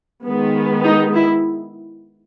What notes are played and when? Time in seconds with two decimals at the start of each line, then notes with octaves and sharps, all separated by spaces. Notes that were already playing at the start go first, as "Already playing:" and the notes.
0.25 D#3 G#3 B3
0.84 D#4
1.14 E4